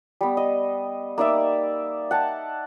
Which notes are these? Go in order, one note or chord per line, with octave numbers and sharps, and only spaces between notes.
G3 B3
D#5
A#3 D#4 D5 E5
F#5 G5 A5